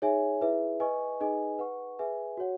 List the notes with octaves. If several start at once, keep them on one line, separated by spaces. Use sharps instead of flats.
D#4 G#4 C#5 E5 G#5
E4 G#4 B4 E5
B4 D#5 G#5 C#6
D#4 G#4 B4 D#5 G#5
B4 F#5 C#6
G#4 B4 E5 G#5
F#4 C#5 F#5